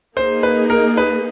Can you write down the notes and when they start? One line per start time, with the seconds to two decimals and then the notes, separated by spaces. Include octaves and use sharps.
0.17 A#3 D#4 G#4 C5
0.43 B4
0.70 A#4
0.97 B4